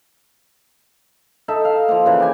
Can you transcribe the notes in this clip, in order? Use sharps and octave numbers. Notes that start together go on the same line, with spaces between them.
D#4 A4 E5
F5
F3 A#3
C#3 E3
G4 G#5